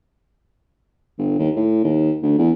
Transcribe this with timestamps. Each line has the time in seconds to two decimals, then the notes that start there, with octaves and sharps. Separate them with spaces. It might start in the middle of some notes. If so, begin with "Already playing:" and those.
1.18 G1
1.39 D#2
1.56 A2
1.84 D#2
2.23 D2
2.38 E2